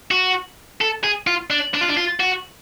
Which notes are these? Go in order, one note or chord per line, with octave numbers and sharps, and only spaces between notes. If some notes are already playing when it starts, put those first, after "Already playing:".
F#4
A4
G#4
F4
D4
D4
F4
D4
F4
F#4